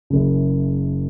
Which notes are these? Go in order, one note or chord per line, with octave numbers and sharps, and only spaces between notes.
F#1 F#2 C#3